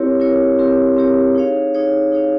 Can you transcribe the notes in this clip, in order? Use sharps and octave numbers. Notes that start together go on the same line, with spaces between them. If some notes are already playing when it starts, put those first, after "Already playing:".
Already playing: C4 E4 G4 A#4 C#5
C4 E4 G4 A#4 C#5
C4 E4 G4 A#4 C#5
C4 E4 G4 A#4 C#5
D#4 G#4 C#5 F5
D#4 G#4 C#5 F5
D#4 G#4 C#5 F5